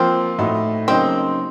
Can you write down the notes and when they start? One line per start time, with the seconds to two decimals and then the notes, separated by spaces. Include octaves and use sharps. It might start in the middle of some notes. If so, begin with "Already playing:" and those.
Already playing: F3 A#3 C4 F4
0.38 A2 A3 D#4 F#4
0.88 C#3 F#3 A#3 C4 D#4